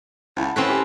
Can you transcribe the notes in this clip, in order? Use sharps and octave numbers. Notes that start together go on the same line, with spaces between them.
C#2 E4 F#5 A5
A2 C4 C#4 B4
G4